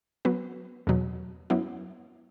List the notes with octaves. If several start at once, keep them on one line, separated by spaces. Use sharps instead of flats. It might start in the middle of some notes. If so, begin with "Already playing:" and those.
F#3 B3 F#4 B4
E2 B2 F#3
F#2 F#3 B3 E4